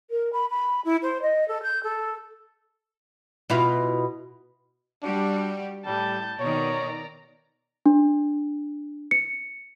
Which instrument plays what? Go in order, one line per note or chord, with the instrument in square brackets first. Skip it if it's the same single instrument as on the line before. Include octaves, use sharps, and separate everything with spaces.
[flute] A#4
B5
B5
E4
C5
D#5
A4
G6
A4
[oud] B2 E4 F4
[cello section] G3 F#4 G4 [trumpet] D4
[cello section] A2 [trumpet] G3 [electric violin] A5 G6
[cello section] B2 D#3 [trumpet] C#5 [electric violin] D5 A#5
[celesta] D4
C#7